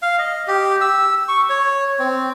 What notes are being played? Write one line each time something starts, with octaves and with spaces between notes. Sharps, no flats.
F5
D#5
G4
E6
C#6
C#5
C4